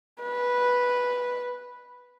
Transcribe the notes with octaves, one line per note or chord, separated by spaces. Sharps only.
B4